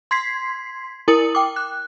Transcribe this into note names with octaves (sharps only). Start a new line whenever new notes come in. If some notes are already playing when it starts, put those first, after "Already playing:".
C6 G#6 B6 C7
E4 A#4 D#6 C#7 F#7
G5 D6
F#6